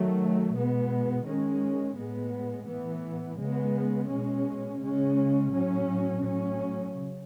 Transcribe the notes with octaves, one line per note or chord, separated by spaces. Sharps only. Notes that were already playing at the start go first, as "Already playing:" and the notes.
Already playing: D#3 F#3 A3
B2 G#3 B3
D#3 G#3 C#4
A2 G#3 B3
A2 E3 B3
C#3 G#3 B3
B2 G#3 C#4
C#3 G#3 C#4
A2 F#3 C#4
A2 F#3 C#4
C#3